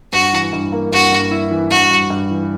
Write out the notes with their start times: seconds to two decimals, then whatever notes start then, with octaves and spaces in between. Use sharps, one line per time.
0.12 G2 F#4
0.33 E3
0.53 G2
0.72 A#3
0.92 G2 F#4
1.12 G2
1.31 E4
1.51 E3
1.70 G2 F#4
1.91 G2
2.10 G2
2.31 E3